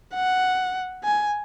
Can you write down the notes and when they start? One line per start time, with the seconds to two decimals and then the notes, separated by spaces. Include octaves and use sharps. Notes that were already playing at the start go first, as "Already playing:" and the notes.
0.15 F#5
1.04 G#5